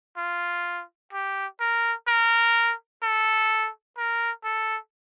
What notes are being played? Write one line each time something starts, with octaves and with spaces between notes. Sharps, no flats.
F4
G4
A#4
A#4
A4
A#4
A4